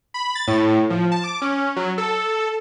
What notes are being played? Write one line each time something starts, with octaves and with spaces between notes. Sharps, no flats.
B5
A6
A2
F3
A5
D6
C#4
F#3
A4